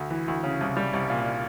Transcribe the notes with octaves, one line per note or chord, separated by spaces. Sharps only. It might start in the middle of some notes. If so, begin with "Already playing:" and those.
Already playing: D2
E3
D2
C#3
C2
G3
C2
A#2